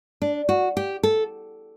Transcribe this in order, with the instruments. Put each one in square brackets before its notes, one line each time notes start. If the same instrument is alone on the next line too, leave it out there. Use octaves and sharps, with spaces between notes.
[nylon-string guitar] D4
F#4
G4
A4